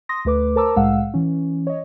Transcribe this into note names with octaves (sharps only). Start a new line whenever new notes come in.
C6 D#6 A#6
D2 A3 B4 D6
A#4 C5 A5 A#5 D6 E6
C2 A2 G#3 F5 F#5 E6
E3 C#4
C#5 D#5